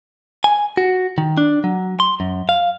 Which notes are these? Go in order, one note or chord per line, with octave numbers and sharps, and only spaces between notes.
G#5
F#4
D#3
D4
F#3
C6
F#2
F5